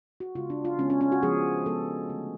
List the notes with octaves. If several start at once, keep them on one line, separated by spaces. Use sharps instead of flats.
F#4
C#3 G#3 B3 F4
D4
F4
C#3 G#3 B3 C#4
C#4
C#4
F#4
F3 G#3 B3 G#4
F3 G#3 B3 A4
D3 F3 A3